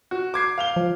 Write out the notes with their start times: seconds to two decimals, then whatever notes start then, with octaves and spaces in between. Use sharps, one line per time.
0.11 F#4
0.34 D6 G#6 C7
0.58 F5 F7 G7
0.76 F3